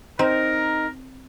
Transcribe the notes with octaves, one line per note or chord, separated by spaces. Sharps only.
C4 D#4 A#4